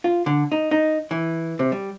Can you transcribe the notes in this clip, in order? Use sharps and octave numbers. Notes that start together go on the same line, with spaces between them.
F4
D3
D#4
D#4
E3
C3
G3